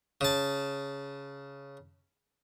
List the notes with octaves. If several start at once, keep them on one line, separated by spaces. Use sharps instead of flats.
C#3 A5